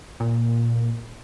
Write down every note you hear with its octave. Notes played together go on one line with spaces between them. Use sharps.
A#2